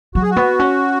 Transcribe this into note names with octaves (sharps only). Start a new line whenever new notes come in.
F#3 F#4
G#4
F#4
B3
C#4